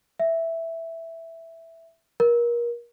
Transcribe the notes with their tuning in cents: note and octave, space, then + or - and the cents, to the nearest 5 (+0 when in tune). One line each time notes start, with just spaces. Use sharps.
E5 +0
A#4 +30